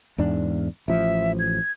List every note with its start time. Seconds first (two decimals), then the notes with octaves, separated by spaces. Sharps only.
0.18 E2 G#2 D4
0.88 A1 F3 E5
1.39 G#6